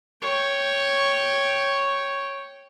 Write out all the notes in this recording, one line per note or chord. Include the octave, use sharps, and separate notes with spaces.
C#5 G5